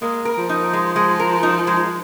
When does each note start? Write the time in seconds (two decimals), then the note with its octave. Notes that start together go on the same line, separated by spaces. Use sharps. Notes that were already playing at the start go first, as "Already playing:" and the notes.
0.02 G#3 A#3
0.25 A#4
0.38 F3
0.49 D#4
0.73 G#3
0.96 G#3
1.19 A#4
1.43 D#4
1.67 G#3